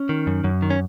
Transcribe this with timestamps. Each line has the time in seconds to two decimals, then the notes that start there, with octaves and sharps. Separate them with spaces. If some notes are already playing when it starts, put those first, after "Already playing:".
Already playing: C#4
0.09 D#3
0.27 F#2
0.44 F#2
0.62 D#3
0.70 C#4